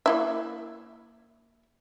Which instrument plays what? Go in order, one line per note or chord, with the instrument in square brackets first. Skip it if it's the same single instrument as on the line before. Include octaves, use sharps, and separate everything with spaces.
[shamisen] A#3 E4 E5